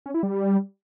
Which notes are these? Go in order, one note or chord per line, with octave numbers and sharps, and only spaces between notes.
C#4
E4
G3